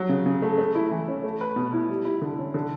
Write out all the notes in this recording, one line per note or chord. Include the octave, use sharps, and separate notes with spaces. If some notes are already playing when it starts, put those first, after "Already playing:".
Already playing: F#3
C#3
C#3
A3
A3
E4
E3
C#4
A3
B4
B2
E4
G3
E4
D3
C#4
D3